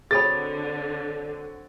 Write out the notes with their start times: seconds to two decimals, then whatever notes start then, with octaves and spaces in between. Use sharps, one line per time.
0.11 D3 C4 F#4 G#4 A4 C#5 B5 A6